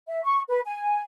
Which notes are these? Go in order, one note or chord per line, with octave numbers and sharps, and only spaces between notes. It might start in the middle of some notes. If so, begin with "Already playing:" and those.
E5
C#6
B4
G#5